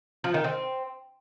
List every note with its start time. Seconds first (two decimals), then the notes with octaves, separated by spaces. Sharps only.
0.24 F3
0.34 D#3
0.44 C4